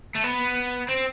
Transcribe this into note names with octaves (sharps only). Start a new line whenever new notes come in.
A3
B3
C4